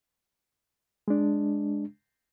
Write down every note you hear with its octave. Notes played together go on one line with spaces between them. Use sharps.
G#3 D4